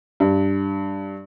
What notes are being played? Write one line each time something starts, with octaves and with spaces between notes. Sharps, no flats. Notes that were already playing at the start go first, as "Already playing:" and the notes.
G2